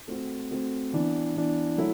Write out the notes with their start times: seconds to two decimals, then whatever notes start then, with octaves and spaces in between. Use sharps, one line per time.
0.08 A3 C4 F#4
0.51 A3 C4 F#4
0.93 E3 B3 D4
1.36 E3 B3 D4
1.78 F#3 A3 E4